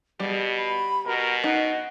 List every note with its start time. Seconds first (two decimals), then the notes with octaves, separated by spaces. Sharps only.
0.20 B2 G3 G#4
0.56 B5
1.07 B2 F#4 A#4
1.44 D#4 D#5 F#5